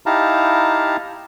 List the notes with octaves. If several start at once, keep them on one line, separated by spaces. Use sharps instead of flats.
D#4 E4 G4 F5 A5 A#5